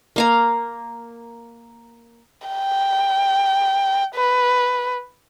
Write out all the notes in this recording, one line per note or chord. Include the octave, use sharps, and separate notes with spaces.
A#3 F5 A#5
G5
B4